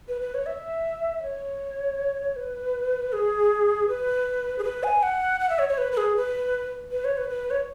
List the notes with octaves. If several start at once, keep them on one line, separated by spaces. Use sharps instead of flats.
B4
B4
C#5
E5
C#5
B4
G#4
B4
G#4
B4
G#5
F#5
F#5
E5
C#5
C#5
B4
B4
G#4
B4
B4
C#5
B4
B4
C#5